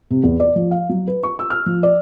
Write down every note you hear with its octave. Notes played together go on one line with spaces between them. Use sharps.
C3
E2
D5
F3
F5
F#3
B4
C#6
E6
F6
F3
D5